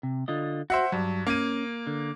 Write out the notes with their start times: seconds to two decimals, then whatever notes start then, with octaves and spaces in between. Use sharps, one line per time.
0.03 C3
0.28 D3 F4 D#5
0.70 F#4 C5 E5 F#5
0.92 G2 F#3
1.27 A#3 C#4 D#7
1.87 D3